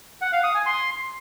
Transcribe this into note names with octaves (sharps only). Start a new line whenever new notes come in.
F#5
F5
D#6
G#5
C6